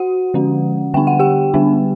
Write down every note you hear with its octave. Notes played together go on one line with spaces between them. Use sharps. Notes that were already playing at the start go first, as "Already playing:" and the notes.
Already playing: F#4 F#5
D3 F3 G#3 C#4
D3 G3 B3 D4 G5
F#5
G4 G5
D3 G3 B3 D4